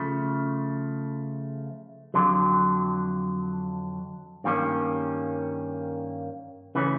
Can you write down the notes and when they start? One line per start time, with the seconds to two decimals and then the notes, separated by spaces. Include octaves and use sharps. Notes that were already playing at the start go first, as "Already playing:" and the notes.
Already playing: C#3 F3 A3
2.14 F2 D3 F#3
4.44 G2 D#3 G3 A#3 C#4
6.75 C#3 E3 A3 C#4